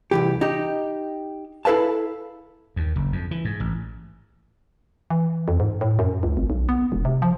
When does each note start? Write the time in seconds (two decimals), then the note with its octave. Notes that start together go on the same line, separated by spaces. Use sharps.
0.11 C2 E3 G4
0.41 D#4 G4
1.65 E4 A4 B4 F5 A5
2.76 D#2
2.96 F#1
3.12 F2
3.31 E3
3.45 G#2
3.60 A1
5.10 E3
5.48 F2
5.60 G#2
5.81 A2
5.99 F#2
6.23 C#2
6.37 G#1
6.50 B1
6.69 B3
6.92 E1
7.05 C3
7.22 F3